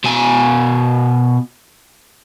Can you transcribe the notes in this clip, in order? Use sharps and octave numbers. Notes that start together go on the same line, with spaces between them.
B2 G#5